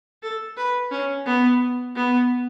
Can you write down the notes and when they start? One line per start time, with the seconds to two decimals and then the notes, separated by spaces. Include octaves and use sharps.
0.23 A4
0.57 B4
0.91 C#4
1.26 B3
1.96 B3